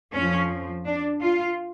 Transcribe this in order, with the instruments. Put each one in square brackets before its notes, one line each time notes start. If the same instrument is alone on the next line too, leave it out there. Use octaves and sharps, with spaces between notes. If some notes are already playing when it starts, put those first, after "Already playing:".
[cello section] F2 F3 C#4
D4
F4